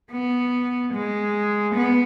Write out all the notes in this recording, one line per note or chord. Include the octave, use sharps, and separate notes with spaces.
B3
G#3
B3